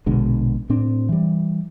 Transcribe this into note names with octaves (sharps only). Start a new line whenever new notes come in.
A#1 B2 D3 G#3
A2 C4 D4
E3 G3